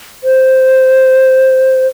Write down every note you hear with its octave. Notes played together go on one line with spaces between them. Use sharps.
C5